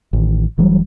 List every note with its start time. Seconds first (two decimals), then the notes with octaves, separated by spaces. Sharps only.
0.13 A1 D#3
0.58 E1 E3 F#3 G3